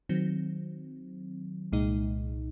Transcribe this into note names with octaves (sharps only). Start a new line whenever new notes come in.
D#3 F#3 C4
C2 A#2 G#3 D#4